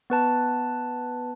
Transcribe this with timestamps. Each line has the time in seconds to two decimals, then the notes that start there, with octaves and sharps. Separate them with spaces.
0.10 B3 B4 A5